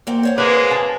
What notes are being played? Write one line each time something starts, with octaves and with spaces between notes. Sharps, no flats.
A#3 C4 F#5
C5 C#5 F#5
G#3 A#3 G#4 B4
A5